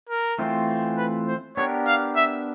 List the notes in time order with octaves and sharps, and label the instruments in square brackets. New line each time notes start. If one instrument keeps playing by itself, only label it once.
[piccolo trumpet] A#4
[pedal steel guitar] E3 A3 C4 F4
[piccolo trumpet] B4
C5
[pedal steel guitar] B3 D4 G4 A#4 [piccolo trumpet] C#5
[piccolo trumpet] F5
E5